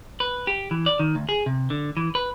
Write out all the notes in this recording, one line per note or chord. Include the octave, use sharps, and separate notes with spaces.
B4
G4
E3
D5
D#3
D2
G#4
C3
D3
E3
B4